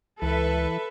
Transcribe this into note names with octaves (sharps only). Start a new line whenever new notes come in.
C#2 E3 A4 B4 E5